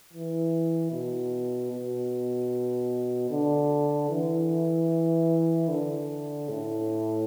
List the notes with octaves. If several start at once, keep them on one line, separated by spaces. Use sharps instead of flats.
E3
B2
B2
D3
E3
D3
A2